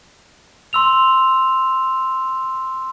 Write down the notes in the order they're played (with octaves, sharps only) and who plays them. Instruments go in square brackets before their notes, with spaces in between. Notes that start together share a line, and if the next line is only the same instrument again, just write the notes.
[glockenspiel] C6 E6 F7